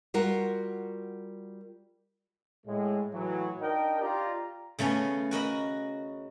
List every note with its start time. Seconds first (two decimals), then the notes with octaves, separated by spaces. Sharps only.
0.14 G3 F4 F#4 A#4
2.66 A2 G#3
3.13 A2 E3 F#3
3.61 D4 D#4 A#4 D#5 G5
4.00 F4 G4 D5 A#5
4.79 C#3 A3 B3 C#4
5.31 F#4 A#4 D#5 B5